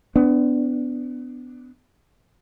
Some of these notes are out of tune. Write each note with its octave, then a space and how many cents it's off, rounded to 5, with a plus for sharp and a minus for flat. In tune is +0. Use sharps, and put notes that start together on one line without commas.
B3 +25 D4 +0